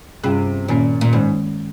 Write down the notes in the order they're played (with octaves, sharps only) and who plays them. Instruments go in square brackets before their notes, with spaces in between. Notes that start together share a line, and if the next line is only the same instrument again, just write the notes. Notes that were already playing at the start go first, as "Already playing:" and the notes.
[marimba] G2 G3 C#4 G#4 [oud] C3
[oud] A#2 [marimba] D#3 A#3 C#4
[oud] A#2
[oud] G#2 [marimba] D#3 G#3 C#4